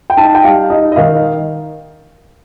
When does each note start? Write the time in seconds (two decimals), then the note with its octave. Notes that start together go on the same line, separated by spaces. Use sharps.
0.10 G5
0.17 D#4 A5
0.35 G5
0.44 G3 F5
0.70 D#4 D#5
0.92 D#5
0.96 D#3 F5